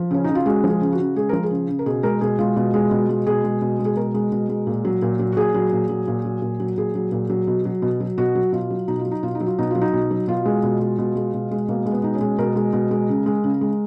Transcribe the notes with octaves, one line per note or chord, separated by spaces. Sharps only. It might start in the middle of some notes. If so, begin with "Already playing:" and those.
Already playing: F3
C#3 C#4
C#3 D#4
F4
G#3 F#4
F3
G#4
C#3
F#4
C#3
G#3 G#4
F3 A#4
G#4
C#3
C#3
A#4
B2 G#4
G#3 A#4
B2 G#4
G#3 F4
B2
G#3
B2
G#3
B2 G#4
G#3
B2
G#3
G#4
B2 A#4
G#3
B2
G#3
A#2
F#3
A#2
F#3
F#4
A#2 G#4
F#3
A#2
F#3
A#2
F#3
A#2
F#3
A#2 G#4
F#3
A#2
F#3
B2
F#3
B2
F#3
B2 F#4
F#3
B2 F4
F#3
B2 D#4
F4
F#3
D#4
B2 F4
D#4
F#3
F4
B2 D#4
F#3 F4
D#4
B2
F#3
B2 F4
G#3
B2
G#3
B2
G#3
B2
G#3
B2 A#3
G#3
B3
B2 D#4
C#4
G#3
B2 A#4
G#3
B2
G#3
C#3
G#3
C#3
G#3